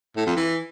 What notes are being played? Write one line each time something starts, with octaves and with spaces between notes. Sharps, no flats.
A2
F2
E3